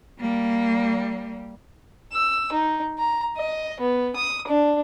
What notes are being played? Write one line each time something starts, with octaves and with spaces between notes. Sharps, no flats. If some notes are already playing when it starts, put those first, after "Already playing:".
G3 A#3
E6
D#4
A#5
D#5
B3
D#6
D4